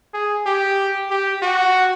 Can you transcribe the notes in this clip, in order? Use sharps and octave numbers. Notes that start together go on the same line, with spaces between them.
G#4
G4
G4
F#4